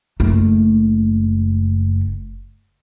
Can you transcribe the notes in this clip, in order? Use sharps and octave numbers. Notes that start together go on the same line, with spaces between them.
F#1 A3